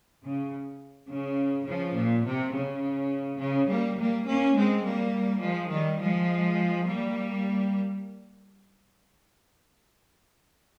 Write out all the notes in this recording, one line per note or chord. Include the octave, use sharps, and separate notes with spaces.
C#3
C#3
C#3 F3
A#2
C3
C#3
C#3
G3 A#3
G3 A#3
A#3 C#4
G#3 C4
G3 A#3
F3 G#3
D#3 G3
F3 G#3
G3 A#3